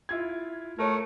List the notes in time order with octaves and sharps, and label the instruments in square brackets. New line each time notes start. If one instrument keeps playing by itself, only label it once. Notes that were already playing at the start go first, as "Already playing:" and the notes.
[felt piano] E4 F4 G#6
[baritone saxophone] A3 [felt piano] A#4 C#5